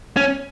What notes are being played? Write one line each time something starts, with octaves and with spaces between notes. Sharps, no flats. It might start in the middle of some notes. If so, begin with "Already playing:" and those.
C#4